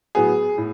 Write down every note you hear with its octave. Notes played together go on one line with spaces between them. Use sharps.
A2 F#3 B3 G#4
A2